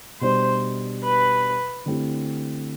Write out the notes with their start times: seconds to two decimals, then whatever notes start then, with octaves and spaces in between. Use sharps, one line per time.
0.21 B2 G3 D4 C5
1.04 B4
1.86 D3 A3 C4 E4 G4